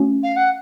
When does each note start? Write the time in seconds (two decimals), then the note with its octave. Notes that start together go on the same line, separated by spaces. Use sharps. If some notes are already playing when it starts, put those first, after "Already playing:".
Already playing: A3 C#4 F#4
0.23 F5
0.36 F#5